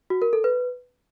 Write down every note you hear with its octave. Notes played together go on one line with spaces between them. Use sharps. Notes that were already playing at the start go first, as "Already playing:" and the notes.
F#4
A#4
A4
B4